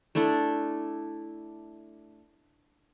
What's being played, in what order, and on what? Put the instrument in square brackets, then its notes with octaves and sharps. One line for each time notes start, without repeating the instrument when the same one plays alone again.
[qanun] A3 D4 E4 A4